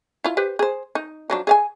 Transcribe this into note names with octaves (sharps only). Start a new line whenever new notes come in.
E4 F4
G4 B4 C5
G#4 C5
D#4
F3 F#3 D4
G#4 F5 G#5